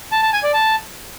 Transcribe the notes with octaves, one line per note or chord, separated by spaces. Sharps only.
A5
A5
G#5
D5
A5